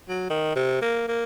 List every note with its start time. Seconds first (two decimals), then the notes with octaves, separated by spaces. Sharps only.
0.09 F#3
0.30 D#3
0.56 C3
0.82 A#3
1.08 A#3